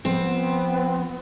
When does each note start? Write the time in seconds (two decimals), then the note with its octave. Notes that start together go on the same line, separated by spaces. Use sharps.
0.05 F3 B3 C4